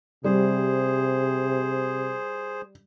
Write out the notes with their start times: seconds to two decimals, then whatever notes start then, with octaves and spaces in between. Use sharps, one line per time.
0.24 C3 G3 G#4 C5